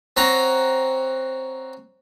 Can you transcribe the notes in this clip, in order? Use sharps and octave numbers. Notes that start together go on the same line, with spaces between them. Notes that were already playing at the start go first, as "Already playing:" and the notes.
C4 C#4 F#5 A#5